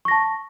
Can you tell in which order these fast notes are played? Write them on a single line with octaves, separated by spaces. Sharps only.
C#6 A#6 A5